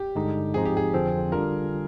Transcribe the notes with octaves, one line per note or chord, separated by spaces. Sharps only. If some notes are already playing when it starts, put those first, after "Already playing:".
Already playing: G4
G2 D3 G#3 D#4
G#2 F3 C4 D#4 G#4
G4
G#4
F2 D3 F3 C4
D3 G3 D4 F4 A#4